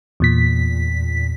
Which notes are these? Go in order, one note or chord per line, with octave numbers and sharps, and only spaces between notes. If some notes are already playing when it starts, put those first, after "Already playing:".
E2 A#2 B6